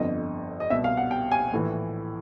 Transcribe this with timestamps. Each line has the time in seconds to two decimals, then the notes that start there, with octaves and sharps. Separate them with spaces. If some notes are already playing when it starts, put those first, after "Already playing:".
Already playing: G1 F2 D3 D#5
0.60 D#5
0.70 C2 B2 E5
0.84 F5
0.97 F#5
1.11 G5
1.32 G#5
1.52 A#1 A2 E3